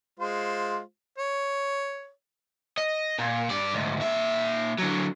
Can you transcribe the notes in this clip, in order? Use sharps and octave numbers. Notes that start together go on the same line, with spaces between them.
G#3 F4 C5
C#5
D#5
A#2
G2 D5
D2 G#2
A#2 E5
D3 F#3